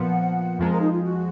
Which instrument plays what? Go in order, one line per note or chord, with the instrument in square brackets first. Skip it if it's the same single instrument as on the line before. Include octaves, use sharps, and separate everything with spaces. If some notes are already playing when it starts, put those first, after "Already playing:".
Already playing: [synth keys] A#2 F3 B3 [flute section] F#5
[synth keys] F2 F3 G#3 [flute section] A#4
[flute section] A#4
D#4
F4
F#4